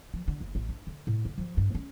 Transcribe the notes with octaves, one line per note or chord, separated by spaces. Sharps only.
F3
D3
F#1
A1
D4
D3
A2
D3
F3
G2
C#4